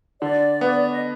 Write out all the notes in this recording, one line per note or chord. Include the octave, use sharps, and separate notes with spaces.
D3 D5
B3
D#5